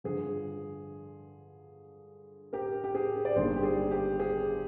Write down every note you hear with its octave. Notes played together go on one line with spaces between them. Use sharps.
G2 D3 F3 G#4
G4 A#4
G4
G#4
D5
G1 G2 D#3 A#3 G#4 C5
G4
G#4
G4
G#4